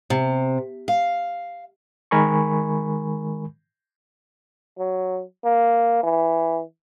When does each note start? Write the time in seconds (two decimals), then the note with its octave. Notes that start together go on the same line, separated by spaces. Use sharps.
0.10 C3
0.88 F5
2.11 D#3 G#3 A#4 G#5 B5 C#6
4.78 F#3
5.44 A#3
6.03 E3